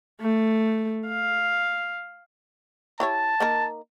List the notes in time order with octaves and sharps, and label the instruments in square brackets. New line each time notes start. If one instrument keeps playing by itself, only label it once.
[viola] A3
F5
[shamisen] E4 G4 C#5 [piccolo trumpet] A5
[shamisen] A#3 D#4 A#4